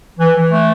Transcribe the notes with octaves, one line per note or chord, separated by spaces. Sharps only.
E3
E3
A3